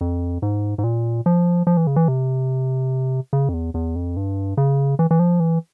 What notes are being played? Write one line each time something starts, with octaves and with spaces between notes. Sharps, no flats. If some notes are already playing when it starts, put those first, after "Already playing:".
F2
G#2
G#2
A#2
F3
F3
E3
C#3
E3
C3
C#3
F2
E2
E2
F2
G2
C#3
E3
E3
F3
E3